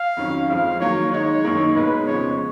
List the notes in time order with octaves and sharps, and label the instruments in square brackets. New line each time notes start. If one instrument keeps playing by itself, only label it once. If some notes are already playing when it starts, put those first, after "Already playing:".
Already playing: [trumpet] F5
[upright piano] F2 D#3 F#3 C#4
[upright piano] F2 F3 G#3 [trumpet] F5
[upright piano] D#3 F#3 A#3 [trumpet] C#5
[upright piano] D#3 G#3 D#4 [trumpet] C#5
[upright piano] F#2 D#3 A#3 D#4
[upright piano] B2 G#3 D#4 [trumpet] B4
[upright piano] F2 C#3 F3 G#3 B3 [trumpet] C#5